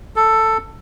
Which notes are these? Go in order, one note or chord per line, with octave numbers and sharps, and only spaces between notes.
A4